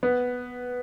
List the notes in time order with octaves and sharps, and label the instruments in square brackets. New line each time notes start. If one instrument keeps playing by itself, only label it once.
[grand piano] B3